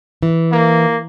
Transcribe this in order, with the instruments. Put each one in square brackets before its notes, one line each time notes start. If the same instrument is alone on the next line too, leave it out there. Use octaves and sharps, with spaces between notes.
[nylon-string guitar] E3
[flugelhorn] A#3